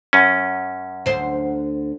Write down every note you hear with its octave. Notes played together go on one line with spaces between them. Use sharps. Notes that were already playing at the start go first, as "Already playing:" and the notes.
F#2 C#4
D2 C5